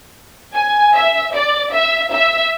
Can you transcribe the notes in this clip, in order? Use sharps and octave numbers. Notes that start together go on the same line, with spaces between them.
G#5
E5
D5
E5
E5